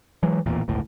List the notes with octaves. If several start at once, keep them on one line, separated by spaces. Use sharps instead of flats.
E3 F#3 G#3
D#1 A1 E2 A#2
G1 C#2 A2